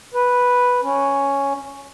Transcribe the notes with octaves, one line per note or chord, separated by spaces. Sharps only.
B4
C#4